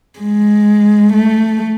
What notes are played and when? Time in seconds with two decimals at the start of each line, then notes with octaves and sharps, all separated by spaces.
0.20 G#3
1.14 A3